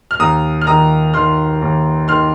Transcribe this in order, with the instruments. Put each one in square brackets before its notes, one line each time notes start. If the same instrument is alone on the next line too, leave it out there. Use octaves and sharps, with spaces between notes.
[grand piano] F6
D#2 A#5 D#6
F6
D#3 A#5 D#6
D#3 C6 F6
D#2
D#3 C6 F6